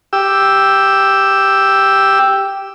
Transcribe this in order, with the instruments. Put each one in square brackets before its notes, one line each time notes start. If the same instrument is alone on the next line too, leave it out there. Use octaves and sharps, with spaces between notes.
[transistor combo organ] G4 E6